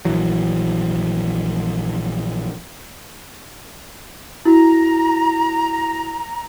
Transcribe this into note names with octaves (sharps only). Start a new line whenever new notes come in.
A#1 E3 F#3
E4 F#4 A#5